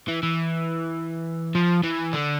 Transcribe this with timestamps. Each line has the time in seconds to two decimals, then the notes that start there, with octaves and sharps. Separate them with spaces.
0.08 E3
0.23 E3
1.55 F3
1.84 E3
2.13 D3